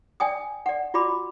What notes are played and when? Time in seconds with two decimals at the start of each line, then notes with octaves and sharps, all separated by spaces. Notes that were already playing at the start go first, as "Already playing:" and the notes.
0.20 D5 G5 G#5 D#6
0.66 D5 F#5
0.94 F4 F#4 D5 B5 D6